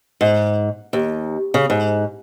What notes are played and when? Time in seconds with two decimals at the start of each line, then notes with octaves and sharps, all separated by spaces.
0.21 G#2
0.93 D#2
1.54 C#3
1.70 G#2